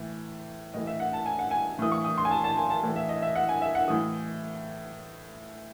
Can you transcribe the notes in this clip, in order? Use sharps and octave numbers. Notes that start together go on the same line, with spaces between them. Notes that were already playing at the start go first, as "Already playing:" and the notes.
Already playing: A2 E3
A2 E3 D#5
E5
F#5
A5
G#5
F#5
G#5
A2 E3 D#6
C#6
D#6
C6
G#5
A5
A5
G#5
A5
A2 E3
E5
D#5
E5
F#5
G#5
E5
F#5
A2 E3 D#6